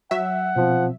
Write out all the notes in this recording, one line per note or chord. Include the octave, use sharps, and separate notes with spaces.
F#3 E5 F#5
B2 F3 C4